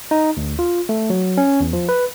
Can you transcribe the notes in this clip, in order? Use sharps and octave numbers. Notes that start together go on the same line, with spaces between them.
D#4
D2
F4
A3
F#3
C#4
E2
F3
B4